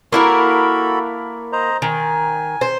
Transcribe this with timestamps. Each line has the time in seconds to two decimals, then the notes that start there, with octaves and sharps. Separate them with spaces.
0.12 A#3 E4 F#4 A4 A#4 B5
1.53 C5 D#5 A#5
1.82 D#3 G#5
2.61 C5